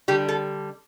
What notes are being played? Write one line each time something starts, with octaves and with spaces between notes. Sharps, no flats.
D3 G3 G4
A4